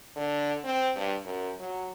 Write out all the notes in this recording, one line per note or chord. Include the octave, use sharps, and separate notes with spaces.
D3
C4
G2
F#2
F#3